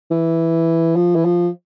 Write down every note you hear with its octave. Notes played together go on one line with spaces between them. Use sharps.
E3
F3
E3
F3